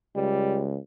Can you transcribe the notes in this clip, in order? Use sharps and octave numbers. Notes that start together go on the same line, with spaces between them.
C#2 G3